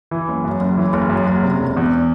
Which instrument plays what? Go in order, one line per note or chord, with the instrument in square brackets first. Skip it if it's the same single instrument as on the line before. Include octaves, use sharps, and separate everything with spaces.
[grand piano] E3
F#1
F#2
F#1
E3
F#1
F#2
F#1
C3
E1
E2